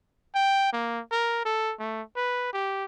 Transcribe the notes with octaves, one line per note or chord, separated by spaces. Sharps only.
G5
A#3
A#4
A4
A3
B4
G4